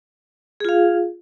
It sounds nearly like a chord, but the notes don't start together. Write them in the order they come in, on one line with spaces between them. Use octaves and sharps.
G#4 F4 F5